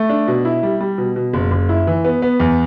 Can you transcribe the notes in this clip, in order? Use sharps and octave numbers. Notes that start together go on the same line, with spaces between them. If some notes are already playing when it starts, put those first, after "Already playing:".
Already playing: A3
D4
B2
E4
G3
G3
B2
B2
F#1
F#1
E4
E3
B3
B3
E2